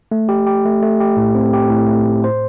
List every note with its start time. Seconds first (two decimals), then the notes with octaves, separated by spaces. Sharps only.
0.12 A3
0.29 G4
0.47 G4
0.65 A3
0.82 A3
1.00 G4
1.17 A2
1.35 C4
1.53 G4
1.70 A2
1.87 A3
2.06 A2
2.24 C5